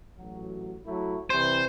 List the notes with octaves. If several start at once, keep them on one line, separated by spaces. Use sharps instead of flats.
A1 F#3
F#3 A3 E4
C3 E3 G3 C5